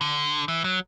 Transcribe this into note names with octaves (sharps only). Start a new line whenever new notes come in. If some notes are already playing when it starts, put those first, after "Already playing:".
D3
E3
F#3